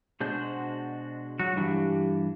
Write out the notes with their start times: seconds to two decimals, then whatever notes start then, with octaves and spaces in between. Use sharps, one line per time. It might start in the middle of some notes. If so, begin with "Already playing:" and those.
0.20 B2 G#3 D4 F#4 C5 G6
1.40 F#3 F#4
1.56 G2 E3 D4 G4